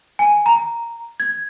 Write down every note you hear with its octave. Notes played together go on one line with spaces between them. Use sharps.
G#5
A#5
G#6